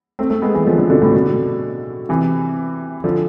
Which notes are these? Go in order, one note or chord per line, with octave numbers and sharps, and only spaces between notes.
A3 C4
A3 C4
G#3 B3
E3 G#3
D3 F3
D3 F3
B2 D3
A2 C3
B2 D3
C3 E3
D3 F3